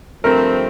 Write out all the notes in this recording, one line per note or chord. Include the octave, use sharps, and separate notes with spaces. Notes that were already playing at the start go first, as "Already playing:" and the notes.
G2 F3 A3 C4 A#4